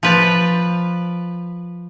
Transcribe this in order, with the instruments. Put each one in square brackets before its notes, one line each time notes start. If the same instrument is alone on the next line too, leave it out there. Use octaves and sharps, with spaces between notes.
[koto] F3 B4 D5